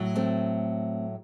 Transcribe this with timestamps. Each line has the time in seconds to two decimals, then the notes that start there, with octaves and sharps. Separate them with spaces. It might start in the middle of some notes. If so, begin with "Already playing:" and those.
Already playing: A2 F#3
0.16 A3 C4